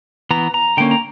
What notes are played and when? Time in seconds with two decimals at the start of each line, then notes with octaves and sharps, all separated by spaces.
0.31 E3 B3 A#5
0.54 A#5
0.77 D3 A#3 C#4 G5
0.91 A#5